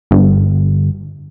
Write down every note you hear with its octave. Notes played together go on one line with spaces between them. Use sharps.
G1